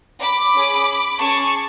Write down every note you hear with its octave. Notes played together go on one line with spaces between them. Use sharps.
B5 D6
C#4 G#4
C#4 G#4 A5 C#6